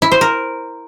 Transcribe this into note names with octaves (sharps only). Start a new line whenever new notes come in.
E4
C5
A#4